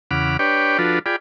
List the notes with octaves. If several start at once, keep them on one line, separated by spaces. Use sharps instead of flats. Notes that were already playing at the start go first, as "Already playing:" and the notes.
E2 C#3 F#5 B5 D6 F6
D4 G4 B4 C#5 D5 G5
F3 D4 F4 F#4 A4 B4
F4 G#4 D5 G5 B5